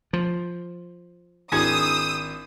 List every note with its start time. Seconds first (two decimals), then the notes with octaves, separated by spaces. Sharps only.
0.13 F3
1.52 G#1 D4 E4 F#4 G#4 D#6 E6 G#6